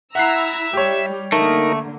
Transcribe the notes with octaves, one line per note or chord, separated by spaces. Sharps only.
E4 E5 F#5 A#5 E6 F#6 C7
G3 G4 C#5
D3 A3 A#3 D#4 A#4